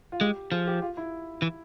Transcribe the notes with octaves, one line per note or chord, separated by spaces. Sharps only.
F4
G#3 G4
F3 G#4
G4
F4
E4
E3